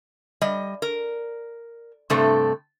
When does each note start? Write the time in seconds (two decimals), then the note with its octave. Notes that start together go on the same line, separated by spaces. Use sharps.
0.41 G3 D#5
0.82 A#4
2.10 G2 C3 A3 C4 A4